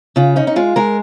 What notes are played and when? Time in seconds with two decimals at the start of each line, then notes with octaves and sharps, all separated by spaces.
0.16 C#3 F4
0.36 C#4 D#4
0.47 D#4
0.56 G#3 F4
0.76 G#3 A#4